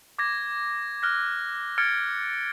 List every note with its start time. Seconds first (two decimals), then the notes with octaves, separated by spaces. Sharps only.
0.19 D6 G#6 A#6
1.02 F6 F#6 A#6
1.78 F6 G#6 A6 C#7 D7